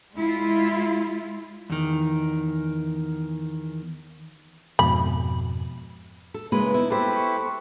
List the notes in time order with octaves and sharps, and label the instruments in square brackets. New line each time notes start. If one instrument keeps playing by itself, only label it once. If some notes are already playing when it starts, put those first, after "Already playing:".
[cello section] G#3 E4 F4
[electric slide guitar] E2 D#3
[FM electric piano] F2 G#2 B2 [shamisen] B5
[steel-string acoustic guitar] A4
[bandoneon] G2 C#3 E3 [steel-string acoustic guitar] G#3 B4 [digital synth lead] A#3
[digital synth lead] B3 [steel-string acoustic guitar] D#4 E4
[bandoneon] E4 G4 B4 [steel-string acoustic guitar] A4 C5
[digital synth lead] C#6